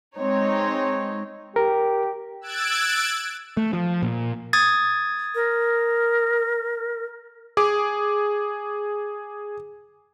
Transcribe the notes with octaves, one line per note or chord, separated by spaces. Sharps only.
G#3 C4 D#4 C#5
G4 A#4
E6 F#6 G#6 A6 D7
A3
F3
A#2
D#6 G#6 A6
A#4
G#4 D6